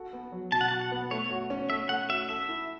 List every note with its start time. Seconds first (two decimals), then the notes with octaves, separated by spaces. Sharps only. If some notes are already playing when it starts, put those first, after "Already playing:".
Already playing: F#4 A4
0.13 B3
0.32 F#3
0.52 B2 A5
0.61 F#5
0.68 A5
0.71 F#4
0.81 F#5
0.92 B3
1.11 A3 C#5
1.31 F#4
1.50 C#4
1.70 A3 E5
1.89 A3 F#5
2.09 F#4 E5
2.29 A4 E5
2.48 E4